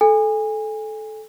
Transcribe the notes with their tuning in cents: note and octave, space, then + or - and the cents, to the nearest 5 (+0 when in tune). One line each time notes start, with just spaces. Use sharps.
A4 -20 G#5 -25